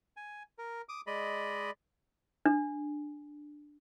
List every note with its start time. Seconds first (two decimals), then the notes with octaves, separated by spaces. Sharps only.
0.17 G#5
0.58 A#4
0.89 D6 D#6
1.07 G#3 D5 D#5 B5
2.46 D4